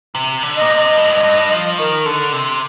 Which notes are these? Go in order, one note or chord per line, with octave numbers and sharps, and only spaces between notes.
C3
D3
D#5
A#2
C3
D#5
G2
A2
G2
G2
F3
D#3 A#4
D3 A4
C3